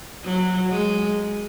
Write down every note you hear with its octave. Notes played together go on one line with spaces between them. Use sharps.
F#3
G#3